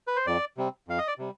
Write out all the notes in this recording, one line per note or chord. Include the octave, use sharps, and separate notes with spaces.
B4
C5
F2 D5
C3 G3 C4
F2 F5
D#5
D5
C3 G3